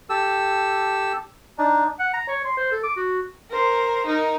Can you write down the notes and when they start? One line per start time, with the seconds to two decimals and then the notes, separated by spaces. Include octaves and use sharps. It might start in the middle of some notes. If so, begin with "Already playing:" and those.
0.09 G4 A4 E6
1.58 D4 D#4
1.99 F#5
2.14 A#5
2.29 C#5
2.45 C6
2.57 C5
2.72 A4
2.84 D6
2.96 F#4
3.50 A#4 C5
4.06 D#4 A#4